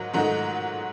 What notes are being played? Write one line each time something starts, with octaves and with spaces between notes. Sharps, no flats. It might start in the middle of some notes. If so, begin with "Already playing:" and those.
Already playing: G#2 D#3 F#3
G#2 D#3 F#3 A3 D#4